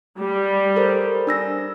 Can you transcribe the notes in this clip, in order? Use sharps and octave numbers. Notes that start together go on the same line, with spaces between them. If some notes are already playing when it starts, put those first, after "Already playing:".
G3
A4 A#4 C5
D4 E6 A#6